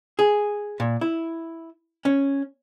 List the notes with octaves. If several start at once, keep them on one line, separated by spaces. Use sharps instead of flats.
G#4
A#2
E4
C#4